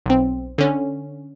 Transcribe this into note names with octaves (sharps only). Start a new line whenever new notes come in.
B1 C4
D3 C#4